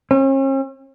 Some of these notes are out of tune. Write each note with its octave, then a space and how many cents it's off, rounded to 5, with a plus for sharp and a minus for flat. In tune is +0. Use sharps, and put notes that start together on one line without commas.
C#4 -45